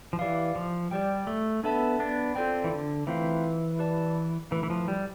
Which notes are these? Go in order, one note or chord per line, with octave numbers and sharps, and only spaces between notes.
F3
E3 G4 D5 F5
F3
G3 G4 D5 G5
A3
B3 D4 A4 E5 A5
B3 D4
C4 F4 A4 D5 G5
E3
D3
E3 A3 C4 F4 C5 F5
G4 B4 D5 A5
E3 A3 E4 B4
E3
F3
G3